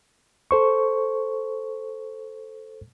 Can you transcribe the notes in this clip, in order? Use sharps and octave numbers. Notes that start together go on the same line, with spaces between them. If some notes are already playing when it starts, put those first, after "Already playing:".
A4 C5 C#6